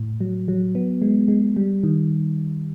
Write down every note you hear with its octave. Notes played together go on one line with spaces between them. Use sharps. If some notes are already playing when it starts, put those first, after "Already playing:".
Already playing: A2
F#3
F#3
B3
G#3
G#3
G3
D#3